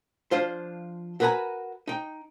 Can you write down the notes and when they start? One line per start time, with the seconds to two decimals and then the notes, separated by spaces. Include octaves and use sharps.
0.31 F3 D4 F4 C5
1.20 F#4 A#4 B4 C#5 G#5 A#5
1.87 D#4 G5